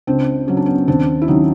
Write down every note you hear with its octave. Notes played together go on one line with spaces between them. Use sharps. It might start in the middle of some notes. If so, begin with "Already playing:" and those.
C#2 C4 D4
C#3 F#3 C#4
D4
B3 C#4
D#2 C4 D4
E4
D#3 F#3 C#4 D#4